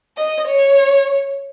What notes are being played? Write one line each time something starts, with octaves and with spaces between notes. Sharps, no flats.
D#5
C#5